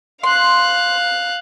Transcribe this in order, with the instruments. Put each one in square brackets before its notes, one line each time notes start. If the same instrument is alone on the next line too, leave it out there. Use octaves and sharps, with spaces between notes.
[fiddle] F5 F#6 [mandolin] C6